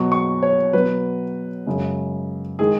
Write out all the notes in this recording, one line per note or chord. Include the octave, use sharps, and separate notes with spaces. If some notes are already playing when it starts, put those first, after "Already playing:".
Already playing: B2 F#3 C#6
C#6
C#5
B2 F#3 B4
F#2 C#3 G#3
D#3 G#3 G#4